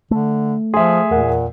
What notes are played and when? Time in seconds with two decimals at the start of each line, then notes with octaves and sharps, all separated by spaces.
0.11 D3 A3
0.74 F3 G#4 E5 C6 D#6
1.11 E2 A#2 A#4 F#5